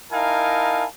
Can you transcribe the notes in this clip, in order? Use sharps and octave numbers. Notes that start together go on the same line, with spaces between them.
D#4 E4 A#4 F5 G#5 A5